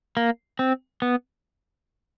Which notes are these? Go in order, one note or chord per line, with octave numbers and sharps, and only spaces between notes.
A#3
C4
B3